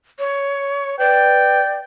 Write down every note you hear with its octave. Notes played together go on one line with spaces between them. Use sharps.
C#5
B4 D5 G5